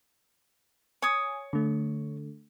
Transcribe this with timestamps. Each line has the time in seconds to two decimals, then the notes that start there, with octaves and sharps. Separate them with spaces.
1.02 C#5 G#5 D#6
1.53 D3 A3